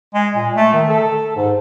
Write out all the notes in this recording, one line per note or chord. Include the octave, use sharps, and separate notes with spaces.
G#3
A#2
A3
D#3
A4
G#2